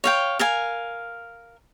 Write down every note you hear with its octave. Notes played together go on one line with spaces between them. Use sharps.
C#5 F5 G5
A#4 F5 G#5